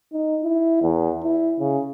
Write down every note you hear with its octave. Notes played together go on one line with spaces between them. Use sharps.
D#4
E4
E2
E4
C#3